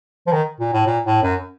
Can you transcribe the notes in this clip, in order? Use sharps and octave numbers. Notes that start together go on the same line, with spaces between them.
F3
D#3
A#2
A2
A#2
A2
F#2